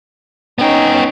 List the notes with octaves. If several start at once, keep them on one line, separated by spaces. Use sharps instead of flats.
B3 C#4 D#4 G5